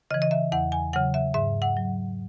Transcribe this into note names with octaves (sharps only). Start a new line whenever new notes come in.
C#3 E3 D#5
D#5
E5
E2 F#5
G#5
C#3 F#3 F#5
E5
G#2 E5
F#5
F#3